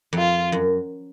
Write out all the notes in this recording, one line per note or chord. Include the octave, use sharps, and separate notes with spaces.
F2
F4
F#2